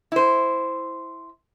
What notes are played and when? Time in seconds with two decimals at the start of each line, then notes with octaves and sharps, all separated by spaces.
0.12 E4 C5